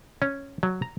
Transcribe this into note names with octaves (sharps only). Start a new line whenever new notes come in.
C#4
F#3
A#5